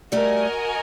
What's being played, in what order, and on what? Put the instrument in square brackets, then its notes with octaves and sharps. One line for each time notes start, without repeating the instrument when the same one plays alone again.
[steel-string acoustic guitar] G3 A3 [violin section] F#4 A#4 D#5 G#5